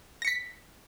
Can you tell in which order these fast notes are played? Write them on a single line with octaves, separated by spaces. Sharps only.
A#6 C#7 B6